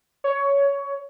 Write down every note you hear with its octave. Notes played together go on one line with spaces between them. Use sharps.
C#5